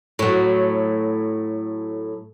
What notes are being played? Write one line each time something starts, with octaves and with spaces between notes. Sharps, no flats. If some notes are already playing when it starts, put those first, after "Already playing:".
A2 F#3